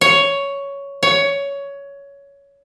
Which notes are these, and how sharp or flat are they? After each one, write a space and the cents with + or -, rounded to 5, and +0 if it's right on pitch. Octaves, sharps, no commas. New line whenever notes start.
C#5 +10
C#5 +15